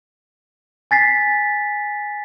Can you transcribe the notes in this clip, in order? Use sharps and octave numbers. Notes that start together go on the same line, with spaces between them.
G#5 A6 B6 C7